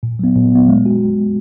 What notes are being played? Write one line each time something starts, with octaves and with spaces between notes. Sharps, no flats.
A#2
F#3 B3
A#2
F#3 B3
G#3
F#4